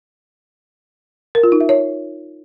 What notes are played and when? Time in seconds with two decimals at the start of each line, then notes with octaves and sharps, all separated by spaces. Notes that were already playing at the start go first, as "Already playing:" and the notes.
1.35 A#4
1.44 F4
1.52 D#4
1.61 E5
1.69 C#5